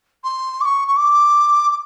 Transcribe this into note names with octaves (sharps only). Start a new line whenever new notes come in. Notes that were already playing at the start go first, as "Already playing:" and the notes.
C6
D6
C#6
C#6
D6
D6